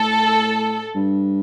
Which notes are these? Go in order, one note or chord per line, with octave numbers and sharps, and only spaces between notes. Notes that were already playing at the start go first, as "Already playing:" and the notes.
Already playing: A2 A4
G2